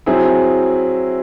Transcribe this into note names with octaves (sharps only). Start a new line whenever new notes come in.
F#3 C4 E4 G#4